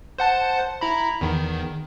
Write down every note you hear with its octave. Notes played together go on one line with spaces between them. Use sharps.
C5 F#5 A5
E4 A#5 B5
E2 D#3